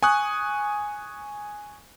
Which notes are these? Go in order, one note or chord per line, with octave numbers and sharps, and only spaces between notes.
G#5 C#6 D#6 F#6